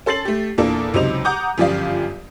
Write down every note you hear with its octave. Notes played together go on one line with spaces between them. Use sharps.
C#4 A4 C6 A6 C7 F#7
A3 G4
E2 A#2 A#3 D4 A4
C#2 C3 F#3 D#4 C5 F7
F#5 A#5 D6 D#6 G6
G1 F#2 F3 G4 D5 F5